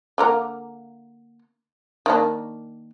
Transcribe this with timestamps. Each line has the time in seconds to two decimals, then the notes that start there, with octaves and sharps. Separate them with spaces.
0.18 D3 A#3 A#4
2.06 D#3 A#3 D4